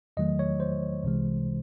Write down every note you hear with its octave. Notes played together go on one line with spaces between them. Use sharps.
E2 D#3 F#3 A3 D#5
C#5
C5
C2 C3 E3 G#3